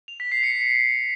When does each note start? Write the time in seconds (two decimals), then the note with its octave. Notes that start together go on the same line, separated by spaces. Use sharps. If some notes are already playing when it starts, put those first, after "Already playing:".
0.08 F7
0.20 B6
0.32 C7
0.43 C#7